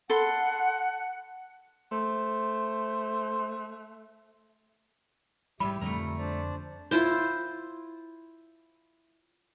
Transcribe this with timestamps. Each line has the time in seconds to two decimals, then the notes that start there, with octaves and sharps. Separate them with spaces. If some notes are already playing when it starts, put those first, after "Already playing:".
0.10 A4 F#5 B5 C6
1.92 A3 C5
5.60 G#2 E3 G3 G4 E5 B5
5.81 F2 D3 F3 G3 A3 A#4
6.18 D4 C5 D5
6.91 E4 F4 C5